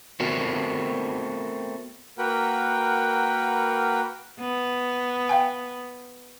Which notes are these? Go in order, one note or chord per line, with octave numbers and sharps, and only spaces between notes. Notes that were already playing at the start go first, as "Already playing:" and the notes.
A3 B3 C4 F#4 A#4
A#3 F#4 A#4 B4 F#5 G5
B3
F5 G5 G#5